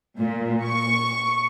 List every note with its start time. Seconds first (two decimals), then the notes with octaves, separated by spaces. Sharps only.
0.19 A#2
0.65 C#6